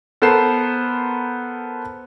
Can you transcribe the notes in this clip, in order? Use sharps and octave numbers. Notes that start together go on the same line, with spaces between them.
B3 A4 A#4 C5 C7 E7